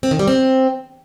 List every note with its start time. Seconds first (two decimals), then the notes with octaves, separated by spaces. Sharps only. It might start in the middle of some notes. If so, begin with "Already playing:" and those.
0.03 C4
0.11 D#3
0.19 G3
0.27 C4